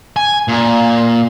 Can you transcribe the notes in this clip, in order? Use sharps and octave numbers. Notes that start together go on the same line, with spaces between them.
G#5
A#2